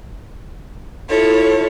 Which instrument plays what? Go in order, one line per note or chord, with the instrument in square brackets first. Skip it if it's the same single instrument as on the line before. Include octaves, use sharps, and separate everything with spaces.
[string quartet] E4 F4 A4 C#5